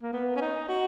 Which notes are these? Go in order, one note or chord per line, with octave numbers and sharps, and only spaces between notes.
A#3
B3
C#4
D#4
F#4